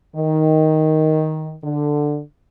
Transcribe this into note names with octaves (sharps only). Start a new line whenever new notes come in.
D#3
D3